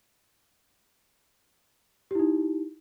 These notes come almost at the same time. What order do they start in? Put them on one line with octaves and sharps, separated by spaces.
G4 E4 D#4